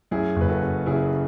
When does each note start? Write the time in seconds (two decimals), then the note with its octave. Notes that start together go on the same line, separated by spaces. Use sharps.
0.11 F#2 E4 G#4
0.36 F#1
0.41 B4
0.49 F#4 A4
0.62 F#1
0.86 C#3 E4 G#4